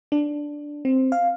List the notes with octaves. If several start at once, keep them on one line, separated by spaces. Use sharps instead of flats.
D4
C4
F5